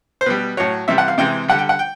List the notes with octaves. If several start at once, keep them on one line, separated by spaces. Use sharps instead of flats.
C5
B2 G3 B4
A2 F#3 C#5
C3 E3 G3 E5
F#5
F5
C3 E3 G#3 G5
D3 G3 F#5
G5
F#5
G5